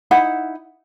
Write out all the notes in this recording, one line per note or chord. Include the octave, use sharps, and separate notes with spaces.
D#4 E4 F#5